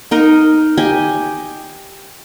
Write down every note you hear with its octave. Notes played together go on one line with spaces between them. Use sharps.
D#4 A#4 D#5
G4 D#5 G#5